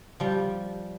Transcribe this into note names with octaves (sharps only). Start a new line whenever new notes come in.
F3 G3